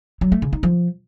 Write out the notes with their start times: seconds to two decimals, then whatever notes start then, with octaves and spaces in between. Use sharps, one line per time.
0.21 F#3
0.32 A3
0.42 C#3
0.53 D#4
0.63 F3